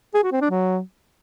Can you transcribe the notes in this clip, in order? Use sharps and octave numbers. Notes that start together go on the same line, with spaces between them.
G#4
F#4
C4
D4
F#3